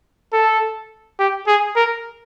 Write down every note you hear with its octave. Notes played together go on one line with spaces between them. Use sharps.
A4
G4
G#4
A#4